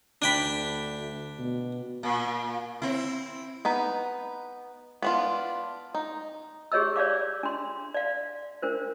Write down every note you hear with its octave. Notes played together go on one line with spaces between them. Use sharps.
D2 D4 G5 B5
B2
A#2
C4 E4
B3 D#4 B4
B3 D4 F4
D#4
G4 G#4 C#5 D#5 E6
C#5 D5 F5 D6
D4 C6
D5 F5
D4 A#4 C5